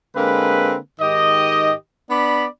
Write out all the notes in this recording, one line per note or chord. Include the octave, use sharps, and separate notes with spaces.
D3 G#3 A#3 C4 B4
G#2 D#3 G4 D#5
B3 D4 D5 B5